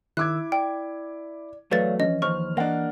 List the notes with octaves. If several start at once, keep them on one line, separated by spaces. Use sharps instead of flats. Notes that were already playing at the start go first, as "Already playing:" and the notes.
D#3 E4 D6 E6 F#6 G#6
D5 G5
E2 F#3 A3 B4 C#5 D5 F5 A6
E3 F3 C#4 D#5
D#2 C5 C#6 F6
E3 A#3 D4 D#5 F#5